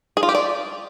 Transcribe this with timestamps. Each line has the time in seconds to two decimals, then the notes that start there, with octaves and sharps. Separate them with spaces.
0.17 G#4
0.23 F4
0.29 G4
0.35 D5